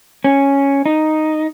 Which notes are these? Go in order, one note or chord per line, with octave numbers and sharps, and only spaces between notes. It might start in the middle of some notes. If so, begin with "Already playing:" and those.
C#4
D#4